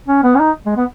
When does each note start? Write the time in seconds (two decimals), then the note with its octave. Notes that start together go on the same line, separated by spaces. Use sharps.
0.08 C#4
0.24 B3
0.35 C#4
0.40 D#4
0.66 G#3
0.77 B3